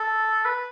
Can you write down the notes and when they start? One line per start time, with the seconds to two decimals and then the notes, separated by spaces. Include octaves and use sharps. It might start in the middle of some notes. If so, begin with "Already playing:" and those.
Already playing: A4
0.45 B4